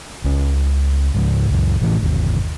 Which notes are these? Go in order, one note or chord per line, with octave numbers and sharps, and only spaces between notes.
C#2 C#4
C#2 G#2
C#2 F#2
A1 A2 C3 E3
G1 D#2